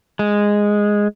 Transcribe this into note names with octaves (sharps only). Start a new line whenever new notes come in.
G#3